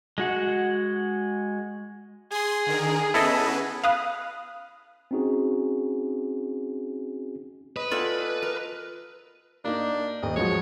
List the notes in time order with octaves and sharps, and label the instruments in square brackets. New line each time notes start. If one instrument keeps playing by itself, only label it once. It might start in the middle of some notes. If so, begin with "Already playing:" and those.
[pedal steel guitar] G#3 F#4 F#5
[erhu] G#4 [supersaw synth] G#5 C6
[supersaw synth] D3 D#3 A#4
[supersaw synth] B3 C#4 B4 [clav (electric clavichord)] E4 A4 D#5
[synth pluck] F5 B5 D#6 F#6
[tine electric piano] C4 C#4 D#4 F#4 G#4
[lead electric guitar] B4 [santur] D#5
[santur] F4 F#5 [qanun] A4 D5 G#5
[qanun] A#4
[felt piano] A#3 D#4 [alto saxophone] D4
[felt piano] D#1 [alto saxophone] D#5
[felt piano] F3 F#3 G#3 [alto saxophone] C#5